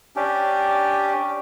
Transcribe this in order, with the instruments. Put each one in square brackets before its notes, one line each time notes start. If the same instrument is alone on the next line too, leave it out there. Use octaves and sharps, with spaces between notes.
[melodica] C#4 D4 G4